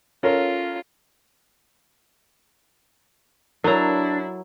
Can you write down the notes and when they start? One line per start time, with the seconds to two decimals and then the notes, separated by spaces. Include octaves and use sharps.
0.23 C#4 F4 A4 A#4
3.64 F#3 D4 E4 A4 A#4 C#5 A#5